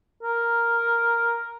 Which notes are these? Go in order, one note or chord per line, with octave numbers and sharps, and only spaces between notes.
A#4